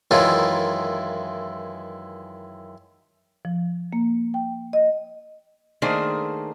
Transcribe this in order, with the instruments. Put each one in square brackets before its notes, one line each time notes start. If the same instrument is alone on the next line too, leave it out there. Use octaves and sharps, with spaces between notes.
[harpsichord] F#2 D#3 E3 G#3 E4 F4
[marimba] F3
A#3
G5
D#5
[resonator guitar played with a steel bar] D#3 A3 A#3 D4 G#4 C5